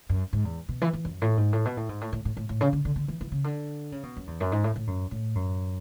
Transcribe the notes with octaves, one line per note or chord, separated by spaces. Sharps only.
F#2
G#2
E2
B2
E3
E3
F#2
A2
G#2
A2
B2
A2
G#2
A2
A2
A2
A2
A2
C#3
D3
D3
D3
E3
E3
C#3
D3
C#3
B2
F#2
E2
F#2
G#2
A2
A2
F#2
A2
F#2